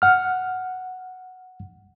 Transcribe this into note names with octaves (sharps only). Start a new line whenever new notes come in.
F#5 F6